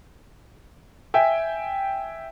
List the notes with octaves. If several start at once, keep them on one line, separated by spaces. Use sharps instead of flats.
E5 G5 G#5